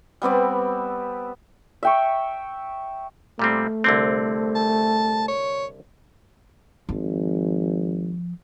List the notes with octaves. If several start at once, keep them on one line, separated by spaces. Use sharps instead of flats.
G3 B3 C4 D5
E5 G5 C#6
A#2 G3 A3 C4
C2 D3 C4
A5
C#5
G#1 F3